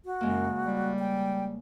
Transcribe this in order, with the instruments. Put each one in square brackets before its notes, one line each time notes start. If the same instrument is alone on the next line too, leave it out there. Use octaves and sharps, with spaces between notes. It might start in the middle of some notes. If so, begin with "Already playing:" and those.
[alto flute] F#4
[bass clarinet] F#2 [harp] C#3 G#3 A#3
[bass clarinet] G3
[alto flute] G5